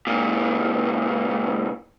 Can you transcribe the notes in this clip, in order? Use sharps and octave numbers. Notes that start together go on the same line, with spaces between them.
C#2 A#2